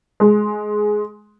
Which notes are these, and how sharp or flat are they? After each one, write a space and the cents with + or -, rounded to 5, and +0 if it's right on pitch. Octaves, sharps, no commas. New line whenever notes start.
G#3 +10